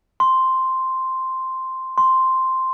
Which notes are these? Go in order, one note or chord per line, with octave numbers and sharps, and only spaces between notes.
C6
C6